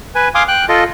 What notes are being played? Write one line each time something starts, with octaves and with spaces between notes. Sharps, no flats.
B4 G#5
F5 G#5 C6 D6 D#6
G5 F#6
F4 A4 D#5